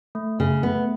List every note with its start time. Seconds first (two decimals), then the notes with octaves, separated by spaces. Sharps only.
0.15 A3
0.39 C#3 A3
0.63 A3 B3